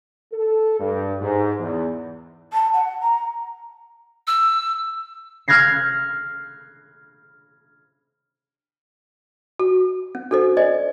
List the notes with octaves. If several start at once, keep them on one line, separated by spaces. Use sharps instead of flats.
A4
G2
G#2
E2
A5
F#5
A#5
E6
F6 F#6 G#6 A#6 C7
F#4
C#4
D4 F#4 A4 C5
C5 D5 D#5 G#5